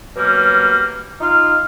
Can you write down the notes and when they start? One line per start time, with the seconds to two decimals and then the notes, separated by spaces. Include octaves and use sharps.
0.15 B2 F#3 G3 A#3
1.20 D#4 F4 F5